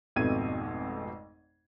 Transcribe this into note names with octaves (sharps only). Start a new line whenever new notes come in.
G#1 F2 B2 A3 G#6 D#7